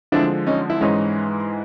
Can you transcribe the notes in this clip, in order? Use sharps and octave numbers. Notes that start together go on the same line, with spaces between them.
D3 F3 G#3 D4 E4
C#4 D#4
E4
G#2 E3 G#3 C#4 D#4